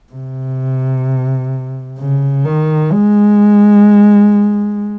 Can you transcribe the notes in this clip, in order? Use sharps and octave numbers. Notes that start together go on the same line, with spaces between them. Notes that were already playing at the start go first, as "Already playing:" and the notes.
C3
C#3
D#3
G#3